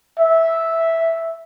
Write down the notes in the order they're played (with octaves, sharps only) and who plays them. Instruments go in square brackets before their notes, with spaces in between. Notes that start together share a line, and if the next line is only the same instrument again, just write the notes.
[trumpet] E5